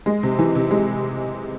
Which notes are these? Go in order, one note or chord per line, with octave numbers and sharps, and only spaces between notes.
G#3
C3
E3
C3
G#3